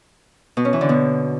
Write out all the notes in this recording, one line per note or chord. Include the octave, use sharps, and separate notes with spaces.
B2
C#4
E3
D3
B2